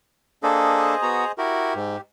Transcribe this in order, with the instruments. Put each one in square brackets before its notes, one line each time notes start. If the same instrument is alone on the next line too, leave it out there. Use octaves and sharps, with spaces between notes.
[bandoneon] A#3 D4 A4 [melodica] G#4 C5 D#5
[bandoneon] B3 F#4 A#5
[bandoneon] E4 F#4 A#4 [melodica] G4
[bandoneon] G#2